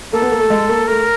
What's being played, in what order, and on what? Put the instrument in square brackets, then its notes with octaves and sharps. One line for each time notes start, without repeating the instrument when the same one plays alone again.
[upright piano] A#3 [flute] A4
[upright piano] B3
A#3
A3
G#3
A#3
[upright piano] A3 [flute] A#4